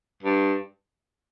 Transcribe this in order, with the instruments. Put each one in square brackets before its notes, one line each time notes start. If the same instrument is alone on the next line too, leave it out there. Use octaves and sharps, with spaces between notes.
[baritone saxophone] G2